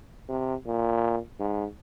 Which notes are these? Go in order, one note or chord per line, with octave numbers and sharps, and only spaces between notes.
C3
A#2
G#2